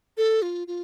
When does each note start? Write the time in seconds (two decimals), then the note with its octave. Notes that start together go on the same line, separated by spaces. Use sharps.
0.17 A4
0.42 F4
0.67 F4